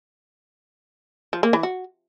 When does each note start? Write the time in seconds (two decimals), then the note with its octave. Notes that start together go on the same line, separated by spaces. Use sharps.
1.33 F3
1.43 A#3
1.53 E3
1.63 F#4